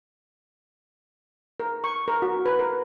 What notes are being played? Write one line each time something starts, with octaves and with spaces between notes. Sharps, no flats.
A#4
C#6
A#4
F#4
B4
A#4